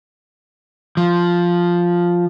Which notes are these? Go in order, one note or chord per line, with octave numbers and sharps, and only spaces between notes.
F3